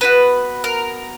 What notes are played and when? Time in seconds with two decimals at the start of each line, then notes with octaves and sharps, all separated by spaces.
0.01 B3 D#4 F#4 B4
0.64 A#4